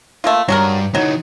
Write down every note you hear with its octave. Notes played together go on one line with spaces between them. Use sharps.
A3 A#3 F4
G2 F#3 F#4 A#4
E3 F#3 D#4